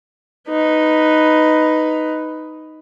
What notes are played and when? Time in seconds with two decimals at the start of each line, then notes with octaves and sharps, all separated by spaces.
0.49 D#4 B4